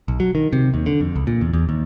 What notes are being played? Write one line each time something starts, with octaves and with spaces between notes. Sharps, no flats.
B1
F#3
D#3
C3
D#2
D3
F2
C#2
A#2
E2
E2
D#2